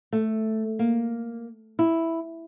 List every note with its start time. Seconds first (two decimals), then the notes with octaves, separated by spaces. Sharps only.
0.12 A3
0.79 A#3
1.79 E4